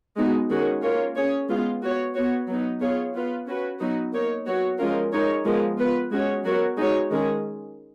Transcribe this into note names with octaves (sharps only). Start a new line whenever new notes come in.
G#3 B3 D#4 F#4
D#3 G#3 C#4 F#4
A#3 C#4 F4 A#4 C#5
C#4 G#4 C#5
G#3 B3 F4
B3 F#4 C#5
B3 F#4 C#5
F#3 B3 D#4
B3 F4 G#4 C#5
B3 F4 B4
C#4 F#4 B4
F#3 B3 D#4 F#4
A#3 D#4 A#4 C#5
F#3 B3 F#4 C#5
F3 G#3 C#4 F4 A#4
G#3 D#4 A#4 C#5
F3 G#3 B3 F4 A#4
B3 F4 B4
G#3 C#4 F#4 C#5
F#3 B3 F#4 A#4 C#5
G#3 D#4 F#4 C#5
D#3 G#3 C#4 G#4